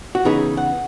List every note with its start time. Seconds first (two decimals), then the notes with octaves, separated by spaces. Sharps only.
0.15 F#4
0.25 C#3 E3 B3 D#4 G#4
0.57 F#5